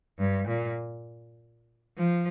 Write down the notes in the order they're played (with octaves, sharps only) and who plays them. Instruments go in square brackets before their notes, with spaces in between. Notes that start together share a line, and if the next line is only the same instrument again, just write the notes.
[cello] G2
A#2
F3